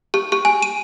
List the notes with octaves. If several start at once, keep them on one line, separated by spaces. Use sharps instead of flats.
G4
G4
G#5
D#7